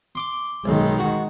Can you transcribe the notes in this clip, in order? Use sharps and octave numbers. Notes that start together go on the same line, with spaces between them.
C6 D6
B1 D#3 G#3
F#4